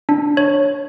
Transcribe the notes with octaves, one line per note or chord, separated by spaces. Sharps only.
D4
C#5